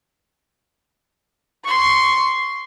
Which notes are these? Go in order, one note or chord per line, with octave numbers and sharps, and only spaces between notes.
C6 C#6